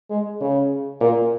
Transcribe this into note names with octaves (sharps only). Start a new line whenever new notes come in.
G#3
C#3
A#2